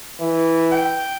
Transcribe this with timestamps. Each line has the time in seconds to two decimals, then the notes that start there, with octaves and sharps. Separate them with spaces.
0.21 E3
0.71 G5